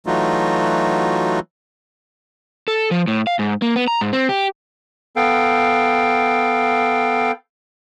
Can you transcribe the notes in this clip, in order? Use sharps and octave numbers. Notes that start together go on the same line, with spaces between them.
E3 F#3 A3 D#4 F4 F#4
A4
F3
A2
F5
G#2
A#3
B3
A#5
G#2
C4
G4
B3 A4 F5 G5